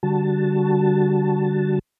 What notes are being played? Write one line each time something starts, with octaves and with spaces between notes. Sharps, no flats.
D3 G3 F#4 A5